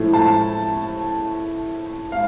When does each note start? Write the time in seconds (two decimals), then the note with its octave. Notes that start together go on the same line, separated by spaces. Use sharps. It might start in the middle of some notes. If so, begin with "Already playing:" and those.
Already playing: A2 F3 A3
0.13 A5
2.12 F5